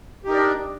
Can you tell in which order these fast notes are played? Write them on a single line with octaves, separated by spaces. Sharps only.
G4 D#4 A#4 D5 D4